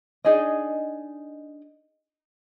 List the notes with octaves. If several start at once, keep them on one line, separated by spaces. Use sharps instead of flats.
D4 D#4 G#4 D#5